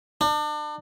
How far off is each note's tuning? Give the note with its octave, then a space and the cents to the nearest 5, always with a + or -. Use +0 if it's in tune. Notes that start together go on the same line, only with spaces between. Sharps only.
D4 +35